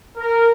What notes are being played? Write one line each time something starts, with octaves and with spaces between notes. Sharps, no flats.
A#4